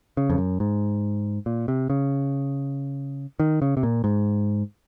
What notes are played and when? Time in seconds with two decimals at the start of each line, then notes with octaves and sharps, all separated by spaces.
0.17 C#3
0.30 F2
0.38 F#2
0.60 G#2
1.46 A#2
1.68 C3
1.90 C#3
3.40 D#3
3.62 C#3
3.77 C3
3.83 A#2
4.04 G#2